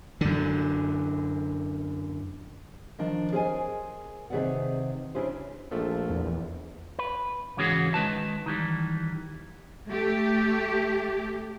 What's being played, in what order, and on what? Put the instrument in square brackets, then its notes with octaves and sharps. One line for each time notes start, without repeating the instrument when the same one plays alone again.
[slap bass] F#2 D3
[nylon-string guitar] D#3 F3 D4
G#4 A#4 C5 D5 D#5 G#5
C3 D#3 G#4 B4 D5 F#5
C#3 D4 E4 G#4 B4 C5
[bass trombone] A#1 [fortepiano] F3 A3
[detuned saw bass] E2
[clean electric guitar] B4
C#2 G#2 E3 C#4 F#4 G#4
D#3 G#3 B4 A5
D#3 E3 G3
[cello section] A3 G4